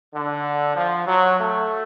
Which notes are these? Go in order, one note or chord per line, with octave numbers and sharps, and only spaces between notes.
D3
F3
F#3
A3